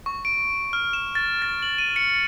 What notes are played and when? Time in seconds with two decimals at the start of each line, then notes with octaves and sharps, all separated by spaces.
0.06 C#6
0.25 D7
0.73 F6
0.93 E7
1.15 A6
1.42 A6
1.62 F#7
1.78 D#7
1.96 C#7